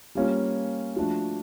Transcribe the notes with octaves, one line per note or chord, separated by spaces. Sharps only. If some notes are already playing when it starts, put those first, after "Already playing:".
G3 A#3 C#4 F4
F3 A3 D4 F#4